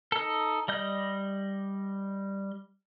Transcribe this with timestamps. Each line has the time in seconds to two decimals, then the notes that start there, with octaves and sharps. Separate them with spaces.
0.12 D#4 A4
0.68 G3 D#5 G6